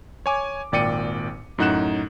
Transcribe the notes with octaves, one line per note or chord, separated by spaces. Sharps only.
C#5 G#5 D6
G#1 A#2 D5 G5 C#7 D#7
F#2 A2 D#4 F#5 F#6 E7